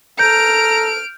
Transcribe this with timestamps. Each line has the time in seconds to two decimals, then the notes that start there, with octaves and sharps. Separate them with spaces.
0.19 A4 A#5 F6 G6 D7